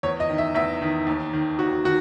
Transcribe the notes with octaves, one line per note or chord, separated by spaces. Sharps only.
E2 C#5
D#5
D#3
E5
E2 E5
D#3
D#2
D#3
D#2 F#4
D#3 F#4